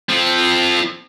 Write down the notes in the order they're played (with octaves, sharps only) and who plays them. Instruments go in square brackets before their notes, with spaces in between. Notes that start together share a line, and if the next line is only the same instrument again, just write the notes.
[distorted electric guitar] F3 C4